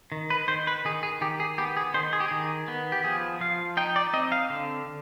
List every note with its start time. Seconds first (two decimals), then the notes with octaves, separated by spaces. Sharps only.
0.12 D#3
0.30 B4
0.48 D#3 C5
0.67 B4
0.85 D#3 G#4
1.03 G#4
1.21 D#3 G4
1.40 G#4
1.58 B3 G4
1.77 G#4
1.94 D#3 C5
2.13 G#4
2.20 G4
2.28 D#3 G#4
2.68 B3
2.92 G4
3.04 F3 G#4
3.41 F3 F5
3.77 D#4 G5
3.96 D5
4.13 C4 D#5
4.32 F5
4.50 D3